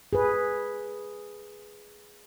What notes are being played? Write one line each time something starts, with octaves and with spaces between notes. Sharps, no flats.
G#4 B4